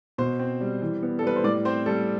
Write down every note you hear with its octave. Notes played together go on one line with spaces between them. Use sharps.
B2 C5
C4
G3
E3
B3
A4
G3 B4
C5
A2 D5
C4 C5
G3 A4